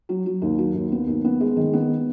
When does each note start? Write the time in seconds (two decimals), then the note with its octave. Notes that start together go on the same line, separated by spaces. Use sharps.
0.09 F#3
0.26 F#3
0.42 D#2
0.58 F#3
0.74 D#2
0.92 B3
1.07 D#2
1.24 B3
1.40 G#3
1.56 D#3
1.73 B3